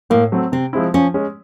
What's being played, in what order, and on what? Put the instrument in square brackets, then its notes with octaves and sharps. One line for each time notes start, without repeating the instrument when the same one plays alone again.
[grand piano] A2 [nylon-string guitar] A#3
[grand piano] F#3 A3 C4
[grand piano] C3 [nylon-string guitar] C4
[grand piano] F3 G#3 C4 E4
[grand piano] F3 [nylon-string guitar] C#4
[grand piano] G#3 C#4